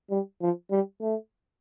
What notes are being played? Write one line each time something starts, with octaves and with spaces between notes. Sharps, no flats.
G3
F3
G3
A3